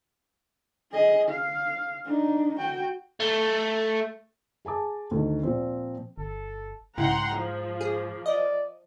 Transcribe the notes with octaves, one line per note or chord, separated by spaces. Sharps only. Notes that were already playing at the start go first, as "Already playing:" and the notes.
G#4 D#5
F5
D4 D#4
F#4 G5
A3
G#4 G#5 A5 D6
D2 D#3
A#2 F3 C4
G1 A4
B1 G#2 C#3 E4 F#5 G5 A#5 C6
F3 G#4
A#3 G#4
D5 D#5